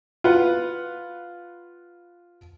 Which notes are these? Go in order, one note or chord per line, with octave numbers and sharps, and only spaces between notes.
F4 B4 F#5